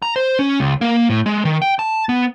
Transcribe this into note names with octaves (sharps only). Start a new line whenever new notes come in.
A#5
C5
C#4
C#2
A#3
A2
G#3
D#3
G5
A5
B3